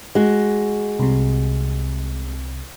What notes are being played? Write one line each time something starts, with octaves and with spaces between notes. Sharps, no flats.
G#3 F#4
C2 C3